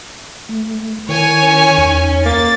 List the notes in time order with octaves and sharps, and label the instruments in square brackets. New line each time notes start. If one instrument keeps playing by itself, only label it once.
[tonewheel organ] A3
[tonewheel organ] D#3 E4 A#4 [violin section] C#5 G#5
[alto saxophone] C#4
[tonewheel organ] E2 D#4
[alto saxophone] A#3 [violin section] A6